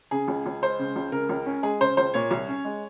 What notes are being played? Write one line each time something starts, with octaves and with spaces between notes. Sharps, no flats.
C#3 G#4
C#2
C#2
G#3 C5
C#3
C#2
C#3 A#4
C#2
C#4
G#3 G#4
C#3 C5
C#2 C5
A#2 C#5
C2
C#4
G#3